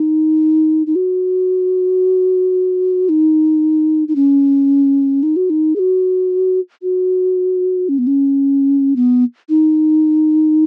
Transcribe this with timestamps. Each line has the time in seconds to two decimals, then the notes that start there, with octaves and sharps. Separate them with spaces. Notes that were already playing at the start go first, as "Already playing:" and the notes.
Already playing: D#4
0.87 D#4
0.96 F#4
3.09 D#4
4.08 D#4
4.16 C#4
5.23 D#4
5.36 F#4
5.50 D#4
5.76 G#4
5.79 F#4
6.82 F#4
7.89 C#4
7.98 B3
8.07 C#4
8.96 B3
9.49 D#4